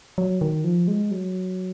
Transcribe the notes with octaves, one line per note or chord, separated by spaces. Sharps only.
F#3
D#3
F3
G#3
F#3